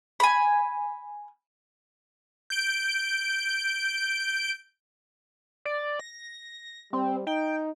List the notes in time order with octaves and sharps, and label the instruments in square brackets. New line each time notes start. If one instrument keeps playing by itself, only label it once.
[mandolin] G#5 B5
[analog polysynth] G6 D7
[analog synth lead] D5
A#6
[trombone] G3 [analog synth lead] C4
[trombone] D#4 [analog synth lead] G5